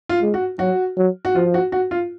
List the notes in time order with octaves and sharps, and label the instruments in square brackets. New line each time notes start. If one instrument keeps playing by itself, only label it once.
[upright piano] F4
[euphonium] G#3
[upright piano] F#4
[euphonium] F#3 [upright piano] F#4
[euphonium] F#3
[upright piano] F#4
[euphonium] F3 [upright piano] F4
[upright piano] F#4
F#4
F4